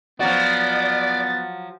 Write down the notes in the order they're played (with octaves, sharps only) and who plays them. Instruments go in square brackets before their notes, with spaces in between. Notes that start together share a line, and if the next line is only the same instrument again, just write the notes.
[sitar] F3 F#3 F#4 [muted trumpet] B3 [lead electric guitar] D5 [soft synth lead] A6